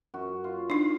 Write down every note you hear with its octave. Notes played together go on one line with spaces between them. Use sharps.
F#2 F#4
F4
D4 D#4